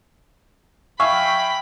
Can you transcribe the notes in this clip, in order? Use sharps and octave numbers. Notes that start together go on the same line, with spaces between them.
E5 F5 G5 G#5 B5 C#6